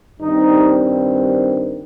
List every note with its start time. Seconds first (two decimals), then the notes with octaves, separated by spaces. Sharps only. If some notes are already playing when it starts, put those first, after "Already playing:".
0.20 G2 D#3 G3 C4 D#4